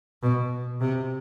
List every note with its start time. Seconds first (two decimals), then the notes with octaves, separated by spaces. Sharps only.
0.22 B2
0.81 C3